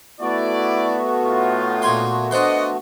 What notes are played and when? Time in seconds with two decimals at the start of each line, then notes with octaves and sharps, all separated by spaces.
0.21 A3 B3 E4 F#4 D5
1.24 A2 D#4 F4
1.82 A#2 G#5 C6
2.31 D4 C5 D#5 F#5 C6